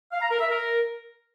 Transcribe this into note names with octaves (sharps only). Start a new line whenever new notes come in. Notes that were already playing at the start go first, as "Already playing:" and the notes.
F5
A#5
A#4
E5
A#4